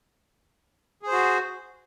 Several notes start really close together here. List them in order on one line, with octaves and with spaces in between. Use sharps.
G#4 C5 F#4